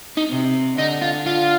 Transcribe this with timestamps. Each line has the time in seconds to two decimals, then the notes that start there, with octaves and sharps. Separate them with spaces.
0.17 D#4
0.30 C3
0.78 D3 D#4
1.02 F4
1.27 F4